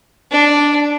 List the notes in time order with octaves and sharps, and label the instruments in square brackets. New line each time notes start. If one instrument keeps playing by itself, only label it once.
[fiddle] D4